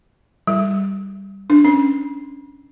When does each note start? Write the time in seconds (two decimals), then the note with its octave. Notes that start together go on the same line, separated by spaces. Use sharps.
0.47 G3
1.50 D4
1.65 C#4